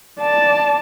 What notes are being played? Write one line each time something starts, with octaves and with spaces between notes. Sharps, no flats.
D5 A5